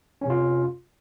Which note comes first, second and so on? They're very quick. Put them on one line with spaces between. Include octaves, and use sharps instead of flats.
C#4 C3 F4